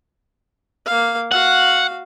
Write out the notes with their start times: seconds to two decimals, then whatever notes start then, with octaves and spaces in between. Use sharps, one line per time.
0.86 A#3 F5
1.32 F#4 F5 F#5